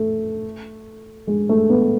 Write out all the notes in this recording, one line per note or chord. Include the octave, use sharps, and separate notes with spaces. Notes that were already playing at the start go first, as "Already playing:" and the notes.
Already playing: A3
G#3
A3
B3